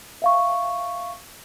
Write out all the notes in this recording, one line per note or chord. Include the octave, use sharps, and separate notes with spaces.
E5 F5 C#6